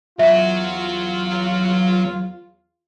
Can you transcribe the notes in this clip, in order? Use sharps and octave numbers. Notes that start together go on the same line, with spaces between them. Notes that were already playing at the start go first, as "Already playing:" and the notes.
E2 F#3 F4 E5 F#5